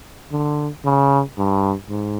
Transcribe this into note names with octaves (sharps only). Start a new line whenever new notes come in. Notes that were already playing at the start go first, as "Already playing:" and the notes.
D3
C#3
G2
G#2